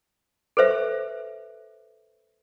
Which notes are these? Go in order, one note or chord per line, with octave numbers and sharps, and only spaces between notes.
A4 B4 C5 E5